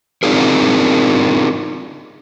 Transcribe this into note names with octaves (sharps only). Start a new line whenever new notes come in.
C4 D4 D#4 F4 G#4 A#4